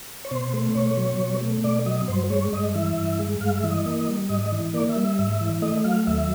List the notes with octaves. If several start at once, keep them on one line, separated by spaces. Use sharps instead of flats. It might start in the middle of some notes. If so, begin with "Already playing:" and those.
C#5
B2 C5
A3
C5
B2 C#5
F#3
B2
A3
B2 D5
F#3 D#5
G2 C5
G#3 C#5
G2 D#5
E3 E5
G2
G#3
G2 F5
E5
E3
D#5
A#3
G3
G#2 D#5
E3
A#3 D5
E5
G3
E5
G#2 E5
E3
A3 D#5
F#3 F5
D#2 E5